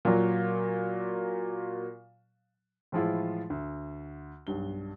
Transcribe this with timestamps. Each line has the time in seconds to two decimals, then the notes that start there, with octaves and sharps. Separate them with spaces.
0.05 A#2 F#3
2.92 A2 E3 F3 G#3 E4 F4
3.50 D2
4.47 B1 G2 G7